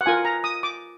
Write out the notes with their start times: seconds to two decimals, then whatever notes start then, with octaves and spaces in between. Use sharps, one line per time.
0.01 F#5
0.06 F4 A#4 G#5
0.25 A#5
0.44 D#6
0.63 D6